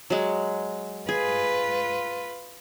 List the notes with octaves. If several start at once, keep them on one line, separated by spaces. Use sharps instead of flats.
F#3 G#3
F4 G#4 B4